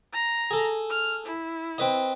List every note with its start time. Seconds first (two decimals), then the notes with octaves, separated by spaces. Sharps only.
0.13 A#5
0.51 G#4 A4
0.90 F6
1.26 E4
1.78 C4 B4 D#5